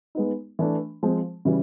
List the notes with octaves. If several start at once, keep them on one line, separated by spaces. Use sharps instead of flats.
G#3 B3 D#4
E3 A3 D4
F3 G#3 C4
C#3 E3 G3